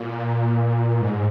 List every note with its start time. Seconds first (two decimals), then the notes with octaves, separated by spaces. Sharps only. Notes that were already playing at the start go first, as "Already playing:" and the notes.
Already playing: A#2
1.01 G#2